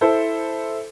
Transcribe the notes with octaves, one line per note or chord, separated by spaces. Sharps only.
E4 A4 C5